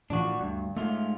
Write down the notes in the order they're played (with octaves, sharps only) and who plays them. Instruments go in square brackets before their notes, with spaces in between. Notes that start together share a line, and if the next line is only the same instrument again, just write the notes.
[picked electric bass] A2 E3 F3 [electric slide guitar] D4 F#4
[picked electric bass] D2 [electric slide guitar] G2
[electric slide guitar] G#2 F4 [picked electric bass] A3